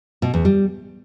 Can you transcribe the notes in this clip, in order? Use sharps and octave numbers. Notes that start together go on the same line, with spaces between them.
B2
E2
G3